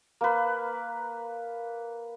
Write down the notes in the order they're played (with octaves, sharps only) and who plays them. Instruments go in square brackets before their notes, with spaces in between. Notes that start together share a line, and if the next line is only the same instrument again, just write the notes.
[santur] A#3 B4